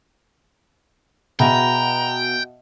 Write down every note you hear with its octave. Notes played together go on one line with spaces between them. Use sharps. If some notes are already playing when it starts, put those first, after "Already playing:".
B2 F#4 G#4 B4 E5 G5 A#5